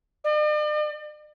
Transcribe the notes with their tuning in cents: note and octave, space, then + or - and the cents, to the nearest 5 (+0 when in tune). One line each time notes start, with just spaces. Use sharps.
D5 +45